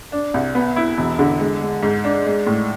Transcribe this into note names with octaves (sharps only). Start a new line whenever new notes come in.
D4
C2
B3
E4
E1
D3
G#3
G#3
G#2
D4
G#3
A2